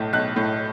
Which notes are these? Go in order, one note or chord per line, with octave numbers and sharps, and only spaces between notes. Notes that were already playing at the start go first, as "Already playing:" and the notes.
Already playing: B1 A2
B1 F#6
A2